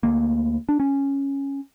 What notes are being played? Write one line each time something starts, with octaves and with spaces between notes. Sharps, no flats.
D2 D3 A#3
D4
C#4